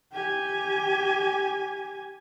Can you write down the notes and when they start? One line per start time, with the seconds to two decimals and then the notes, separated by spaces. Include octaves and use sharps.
0.12 G4 G#5